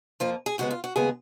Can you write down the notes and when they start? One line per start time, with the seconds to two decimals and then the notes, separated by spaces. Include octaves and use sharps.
0.20 F2 F3 A#3 F4
0.46 G#4
0.58 D#2 C#3 G#3 B3 F#4
0.71 F4
0.84 F#4
0.96 D#2 C#3 G#3 B3 G#4